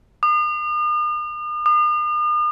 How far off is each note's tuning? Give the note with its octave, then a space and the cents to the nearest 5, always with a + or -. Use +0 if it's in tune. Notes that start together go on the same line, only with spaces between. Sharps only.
D#6 -45
D#6 -45